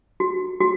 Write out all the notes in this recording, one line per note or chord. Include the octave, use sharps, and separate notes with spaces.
F#4
F#4